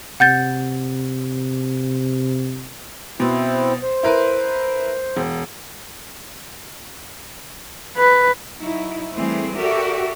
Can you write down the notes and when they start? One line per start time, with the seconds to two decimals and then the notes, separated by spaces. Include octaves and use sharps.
0.20 C3 F#5 G6 A6
3.20 B2 C4 E4 C5
3.82 C5
4.03 E4 A#4 B4
5.17 E1
7.97 B4
8.58 F#3 D#4 E4
9.15 E3 G3 A3 C4 G#4
9.56 F#4 G4 A4 A#4 D5 E5